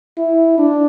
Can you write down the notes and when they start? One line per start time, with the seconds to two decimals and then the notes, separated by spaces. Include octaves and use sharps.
0.17 E4
0.58 D4